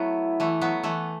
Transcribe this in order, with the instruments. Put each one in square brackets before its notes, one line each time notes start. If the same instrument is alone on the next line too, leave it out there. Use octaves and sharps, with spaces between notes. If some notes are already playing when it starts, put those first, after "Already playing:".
Already playing: [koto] F#3 A3 B3 [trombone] E4
[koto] E3 A3
F#3 B3
E3 A3